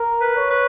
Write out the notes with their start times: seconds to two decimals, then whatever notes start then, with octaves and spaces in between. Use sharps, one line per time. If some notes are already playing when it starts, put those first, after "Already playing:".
Already playing: A#4
0.21 B4
0.36 C#5
0.50 B4